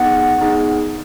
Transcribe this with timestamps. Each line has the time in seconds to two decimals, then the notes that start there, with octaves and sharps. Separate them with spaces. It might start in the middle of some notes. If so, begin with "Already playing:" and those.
Already playing: B3 D#4 G#4 F#5
0.39 B3 D#4 G#4